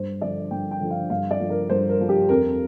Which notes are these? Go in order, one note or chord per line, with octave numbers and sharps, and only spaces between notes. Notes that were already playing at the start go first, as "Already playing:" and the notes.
Already playing: G2 C5
D3 F3 D5
G2 G5
G5
D3 F3
F5
G2 F5
D5
F3
A#4
G2 C5
A#4
F3
G4
F2 A#4